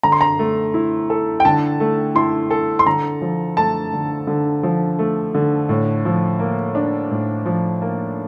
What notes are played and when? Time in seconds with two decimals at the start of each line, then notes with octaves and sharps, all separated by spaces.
0.03 D3 A#5
0.12 C6
0.21 A#5
0.39 A3
0.74 E4
1.10 A4
1.40 G5
1.45 D3 A5
1.80 A3
2.15 E4 C6
2.51 A4
2.79 C6
2.86 D3 A#5
3.21 F3
3.57 A3 A5
3.93 D3
4.27 D3
4.63 F3
4.99 A3
5.35 D3
5.69 A2
6.05 F3
6.40 A#3
6.75 D4
7.11 A2
7.46 F3
7.82 A#3